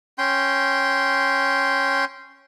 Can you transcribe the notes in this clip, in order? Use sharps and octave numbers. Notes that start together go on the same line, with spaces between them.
C#4 G5 C6